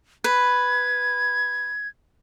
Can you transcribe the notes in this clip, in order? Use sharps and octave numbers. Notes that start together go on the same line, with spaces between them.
B4 G#6